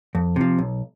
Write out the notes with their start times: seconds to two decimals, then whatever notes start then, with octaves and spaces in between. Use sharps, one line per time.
0.15 F2
0.36 C3 F3
0.59 B1